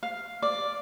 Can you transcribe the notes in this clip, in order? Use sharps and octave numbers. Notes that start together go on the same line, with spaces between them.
F5
D5